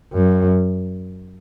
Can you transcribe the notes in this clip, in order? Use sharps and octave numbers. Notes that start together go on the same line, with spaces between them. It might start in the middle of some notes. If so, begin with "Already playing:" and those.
F#2